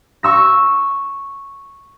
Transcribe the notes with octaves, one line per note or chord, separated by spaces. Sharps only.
C#6 E6 A#6